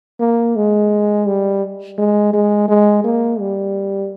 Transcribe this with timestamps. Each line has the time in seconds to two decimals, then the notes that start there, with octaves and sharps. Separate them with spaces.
0.20 A#3
0.56 G#3
1.26 G3
1.98 G#3
2.34 G#3
2.69 G#3
3.04 A#3
3.39 G3